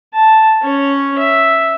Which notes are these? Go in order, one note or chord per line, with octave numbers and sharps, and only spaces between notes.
A5
C#4 C#5
E5